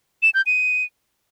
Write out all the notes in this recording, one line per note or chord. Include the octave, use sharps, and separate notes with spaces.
E7
G6
D#7